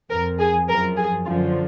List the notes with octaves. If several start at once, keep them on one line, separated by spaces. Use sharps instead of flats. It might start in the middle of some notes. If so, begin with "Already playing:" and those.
F2 F3 A#4
G#4
F#2 F3 A#4
G#4
F#2 D3 F3 F4